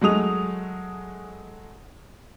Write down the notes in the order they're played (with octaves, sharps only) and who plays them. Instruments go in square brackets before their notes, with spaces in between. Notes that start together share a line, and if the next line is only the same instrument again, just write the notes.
[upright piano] F#3 G#3 A3 D#6 F7